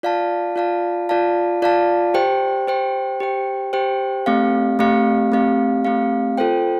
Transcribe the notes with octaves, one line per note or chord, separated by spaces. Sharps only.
F4 D5 F5 A5
F4 D5 F5 A5
F4 D5 F5 A5
F4 D5 F5 A5
G4 C5 G5
G4 C5 G5
G4 C5 G5
G4 C5 G5
A3 C4 G4 F5
A3 C4 G4 F5
A3 C4 G4 F5
A3 C4 G4 F5
F4 A4 C5 G5